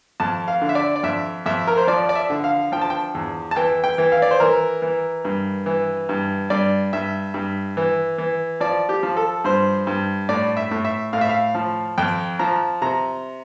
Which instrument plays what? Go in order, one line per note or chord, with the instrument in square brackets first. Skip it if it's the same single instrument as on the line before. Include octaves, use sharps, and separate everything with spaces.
[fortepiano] F2 A5
F5
D3
E5
D5
D5
F2 E5
F2 E5
A#4
C5
F3 D5
D5
E5
D3
F5
F3 G5
A5
G5
E2
A5
E3 G5
G5
E3
F5
D5
C5
E3 A#4
E3
G2
E3
G2
G2 D5
G2 E5
G2
E3
E3
F3 D5
G4
F3
A4
G2 C5
G2
A2 D5
E5
A2
E5
A2 F5
E5
F5
F3
F2 G5
F3 A#5
C3 A#5